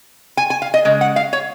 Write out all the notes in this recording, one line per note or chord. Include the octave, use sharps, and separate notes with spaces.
G#5
G#5
F5
D#5
C#3 G#3
F#5
F5
C#5